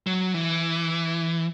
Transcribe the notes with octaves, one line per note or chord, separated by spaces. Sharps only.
F#3
E3